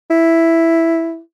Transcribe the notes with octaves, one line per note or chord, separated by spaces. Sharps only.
E4